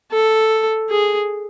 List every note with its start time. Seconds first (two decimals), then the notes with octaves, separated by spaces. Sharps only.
0.11 A4
0.89 G#4